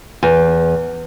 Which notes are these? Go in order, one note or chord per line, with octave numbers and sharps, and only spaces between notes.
E2